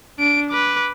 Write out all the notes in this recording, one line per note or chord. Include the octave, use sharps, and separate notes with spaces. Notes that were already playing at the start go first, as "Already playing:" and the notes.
D4 D7
B4 D6